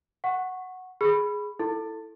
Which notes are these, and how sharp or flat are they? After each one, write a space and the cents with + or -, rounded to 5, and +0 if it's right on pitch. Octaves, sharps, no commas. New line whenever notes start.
F#5 +0 C#6 -15
G#4 +0 B5 +0 E6 +45
E4 +0 A4 +5 C6 +35